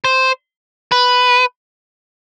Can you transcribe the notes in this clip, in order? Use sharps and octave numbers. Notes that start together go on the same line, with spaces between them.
C5
B4